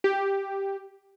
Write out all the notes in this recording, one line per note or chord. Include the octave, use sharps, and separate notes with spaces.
G4